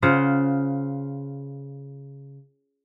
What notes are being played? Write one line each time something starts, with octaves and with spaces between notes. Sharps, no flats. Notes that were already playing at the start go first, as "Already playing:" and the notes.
C#3 F4 C5 F#5